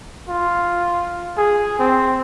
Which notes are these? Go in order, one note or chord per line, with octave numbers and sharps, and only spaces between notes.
F4
G#4
C4